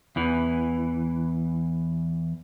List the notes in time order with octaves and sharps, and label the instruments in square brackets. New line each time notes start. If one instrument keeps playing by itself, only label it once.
[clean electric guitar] E2 E3